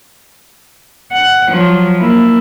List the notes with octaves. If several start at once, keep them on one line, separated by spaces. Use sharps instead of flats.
F#5
F3 F#3
A#3 E4